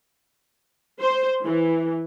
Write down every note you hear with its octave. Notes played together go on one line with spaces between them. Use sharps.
C5
E3